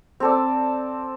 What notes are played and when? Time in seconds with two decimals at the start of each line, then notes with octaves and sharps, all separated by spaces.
0.20 C4 A4 D5